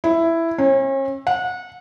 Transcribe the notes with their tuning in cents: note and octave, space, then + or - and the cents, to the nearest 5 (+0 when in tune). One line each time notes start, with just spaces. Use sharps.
E4 +5
C#4 -40
F#5 -25